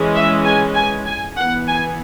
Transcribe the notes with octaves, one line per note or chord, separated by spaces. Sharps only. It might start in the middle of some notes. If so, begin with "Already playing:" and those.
Already playing: E3 G#3 C#4
E5
G#5
G#5
G#5
E3 B3 F#5
G#5